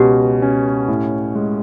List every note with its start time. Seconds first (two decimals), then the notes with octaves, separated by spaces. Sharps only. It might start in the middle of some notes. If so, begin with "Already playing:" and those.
Already playing: C#2 B2 C#4 G4
0.42 C#4
0.88 A2
1.35 G#3